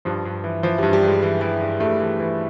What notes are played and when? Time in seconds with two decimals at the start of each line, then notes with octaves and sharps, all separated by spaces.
0.05 G2 F3
0.25 G2
0.44 E3
0.63 E3 F3
0.78 G2 G3
0.93 G3
1.03 G2 G#3
1.23 E3
1.41 E3
1.61 G2
1.80 G2 A3
2.00 E3
2.20 E3